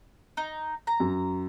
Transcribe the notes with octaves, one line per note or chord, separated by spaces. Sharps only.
D#4
A#5
F#2